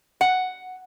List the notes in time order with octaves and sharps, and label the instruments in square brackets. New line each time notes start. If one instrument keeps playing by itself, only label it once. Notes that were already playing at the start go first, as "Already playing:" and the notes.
[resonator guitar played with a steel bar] F#5